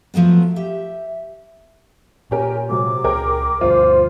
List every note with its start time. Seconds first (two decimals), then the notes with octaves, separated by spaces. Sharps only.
0.14 F3 F#3 A3 B3
0.56 G4 E5
2.31 A#2 C#4 G4 A#4 G#5
2.69 C3 F#3 G#3 D6
3.04 C#2 G#4 A#4 G5
3.61 D2 G2 F4 C5